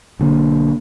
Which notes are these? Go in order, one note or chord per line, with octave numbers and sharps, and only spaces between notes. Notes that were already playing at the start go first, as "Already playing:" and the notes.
B1 D3 A#3